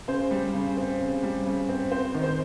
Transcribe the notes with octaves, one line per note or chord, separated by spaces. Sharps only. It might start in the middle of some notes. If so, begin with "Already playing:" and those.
C#3 C5
G3
C#3
C4
C#3
G3
C#3
C4
C4 C5
D#3
C5